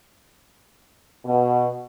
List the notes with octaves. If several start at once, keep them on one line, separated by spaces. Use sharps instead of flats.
B2